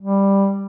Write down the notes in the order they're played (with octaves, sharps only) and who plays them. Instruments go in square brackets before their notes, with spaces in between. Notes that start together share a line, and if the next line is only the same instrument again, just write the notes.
[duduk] G3